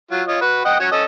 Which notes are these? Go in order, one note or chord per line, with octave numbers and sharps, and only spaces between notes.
F#3 F4
F4 C#5 D#5
F#4 B4
D#5 F#5 G5
C#4 F#4 C#5
C#4 A4 D#5